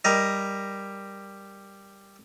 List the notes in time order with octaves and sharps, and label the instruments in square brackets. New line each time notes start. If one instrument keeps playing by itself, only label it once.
[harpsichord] G3 A#4 D#5